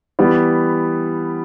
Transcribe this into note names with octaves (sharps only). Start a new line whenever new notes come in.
E3 G3 B3